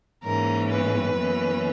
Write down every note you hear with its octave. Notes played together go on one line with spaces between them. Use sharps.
G#2 E3 A#3 C#4 A#4
B3 B4
F#2 E3 A#3 C#4